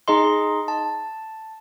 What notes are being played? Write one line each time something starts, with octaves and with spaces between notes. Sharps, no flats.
D#4 G#4 D#5 C6
A5